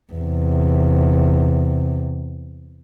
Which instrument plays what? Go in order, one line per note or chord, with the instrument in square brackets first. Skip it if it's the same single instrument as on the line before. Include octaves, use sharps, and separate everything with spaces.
[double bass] E2 C3